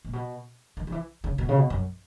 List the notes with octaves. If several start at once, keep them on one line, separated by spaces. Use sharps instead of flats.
A#2
B2
D#3
D#3
E3
C#3
B2
C#3
B2
F#2